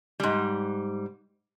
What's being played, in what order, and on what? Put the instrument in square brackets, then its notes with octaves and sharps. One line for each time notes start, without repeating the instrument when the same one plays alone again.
[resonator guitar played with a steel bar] G#2 G3